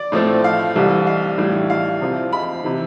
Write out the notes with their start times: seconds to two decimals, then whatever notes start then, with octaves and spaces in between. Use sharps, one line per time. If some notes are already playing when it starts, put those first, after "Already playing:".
Already playing: D5
0.12 A2 F3 A3 C4
0.44 F5
0.75 C2 C3 E3 G3
1.07 F5
1.38 A2 E3 G3
1.70 F5
2.01 C3 F3 C4
2.33 B5
2.64 C3 E3